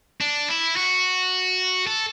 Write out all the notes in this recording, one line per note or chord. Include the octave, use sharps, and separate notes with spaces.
D4
E4
F#4
A4